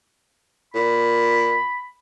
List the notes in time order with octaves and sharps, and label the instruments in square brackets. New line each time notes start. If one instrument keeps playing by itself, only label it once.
[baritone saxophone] A#2 [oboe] B5